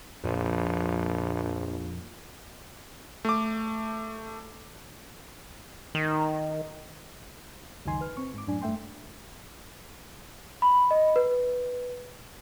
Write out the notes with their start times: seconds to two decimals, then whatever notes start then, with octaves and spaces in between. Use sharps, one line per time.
0.24 A#1 F2 A#2
3.25 A3 D6
5.95 D#3
7.86 C#2 F#2 D#3 D#4 G#5 C6
8.01 B4 F6
8.17 C4 C#6
8.34 G#2 D6
8.47 F#2 A2 D4 G#5
8.62 G2 A3 E5 G5 C6
10.62 B5
10.91 D#5
11.16 B4